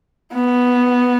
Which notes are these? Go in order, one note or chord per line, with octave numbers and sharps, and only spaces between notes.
B3